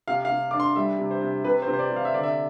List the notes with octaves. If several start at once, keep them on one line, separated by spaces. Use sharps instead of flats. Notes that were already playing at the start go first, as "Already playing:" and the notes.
C3 F5
F5
C3
D4 D6
C6
G3 E5
C3
C5
C3
C3 B4
C5
C3
C5
D5
C3
F5
E5
D3 D5
E5